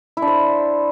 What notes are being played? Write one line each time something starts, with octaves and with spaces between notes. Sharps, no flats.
E4
D4
C5